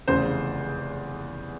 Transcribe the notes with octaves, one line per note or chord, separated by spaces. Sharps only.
F1 E2 C#3 C5